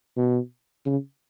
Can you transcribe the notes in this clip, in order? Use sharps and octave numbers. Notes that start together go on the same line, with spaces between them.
B2
C#3